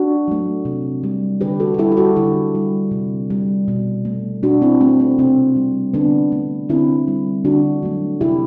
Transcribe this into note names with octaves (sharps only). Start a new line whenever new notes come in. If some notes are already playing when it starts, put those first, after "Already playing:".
Already playing: D4 F#4
F#3 A3
C3
G3
D3 G4 B4
F#4 A4
A4
G3 E4 G4
G4
F#4 A4
D3 E4 G4
G3
C3
G3
B2
A3
B2 D4 F#4
C4 E4
A3 C4
C4
C3 C4
G3
D3 B3 D4
A3
D3 C4 E4
G3
D3 D4 F#4
F#3 A3
C3 E4 G4